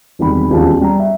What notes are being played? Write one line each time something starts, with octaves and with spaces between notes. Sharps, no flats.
E1 C2 D#3 B5
E1 A1 D#2 F3 A5
G3 A#5
E5